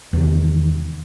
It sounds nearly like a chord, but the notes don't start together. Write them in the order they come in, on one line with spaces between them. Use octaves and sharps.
E2 C3 D#3